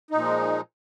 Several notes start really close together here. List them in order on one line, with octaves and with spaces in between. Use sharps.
D#4 A#2 F3 G#3